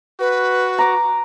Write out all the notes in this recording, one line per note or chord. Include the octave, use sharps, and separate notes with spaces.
F#4 B4
A#5 D6